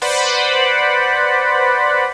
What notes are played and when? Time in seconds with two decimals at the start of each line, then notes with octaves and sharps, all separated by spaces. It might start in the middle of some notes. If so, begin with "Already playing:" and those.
0.02 B4 C5 D5 F#5 B5